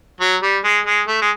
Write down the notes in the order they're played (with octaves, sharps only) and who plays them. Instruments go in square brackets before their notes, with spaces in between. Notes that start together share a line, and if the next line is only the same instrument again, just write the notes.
[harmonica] F#3
G3
G#3
G#3
A3
G#3